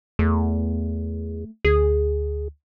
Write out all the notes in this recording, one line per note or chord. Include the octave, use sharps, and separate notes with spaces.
E2 A3
D2 G#4